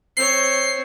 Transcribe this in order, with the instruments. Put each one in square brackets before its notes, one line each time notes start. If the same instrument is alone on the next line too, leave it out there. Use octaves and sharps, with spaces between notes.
[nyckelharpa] C4 C#5 [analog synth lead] C7